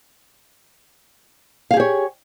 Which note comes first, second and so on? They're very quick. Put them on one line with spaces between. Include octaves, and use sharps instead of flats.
F5 G#4 G4 C#5